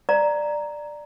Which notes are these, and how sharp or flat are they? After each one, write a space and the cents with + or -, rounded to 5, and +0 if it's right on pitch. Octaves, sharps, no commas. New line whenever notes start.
D5 +10 F5 +0 A#5 +0